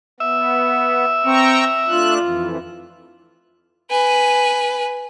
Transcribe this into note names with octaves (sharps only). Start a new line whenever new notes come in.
B3 E5
C4 G5 A#5 C#6
A3 D4 F4 F#6
F2 E3
B4 G#5